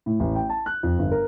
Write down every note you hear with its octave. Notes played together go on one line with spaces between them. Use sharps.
A2
A1
G5
A5
F#6
F2
G1
A#4